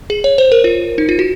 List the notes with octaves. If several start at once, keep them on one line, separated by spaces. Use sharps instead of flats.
G#4
C#5
C5
A#4
F4
D#4
F4
F#4